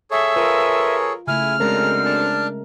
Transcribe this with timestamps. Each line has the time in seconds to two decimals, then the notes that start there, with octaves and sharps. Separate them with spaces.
0.11 G#4 A4 C#5 E5
0.36 G#3 F4 A#4 B4
1.27 C#3 A3 E4 G#5 F6
1.60 F#2 D3 G#3 C4 C#4 A#4 A5 A#5
2.05 D4 A5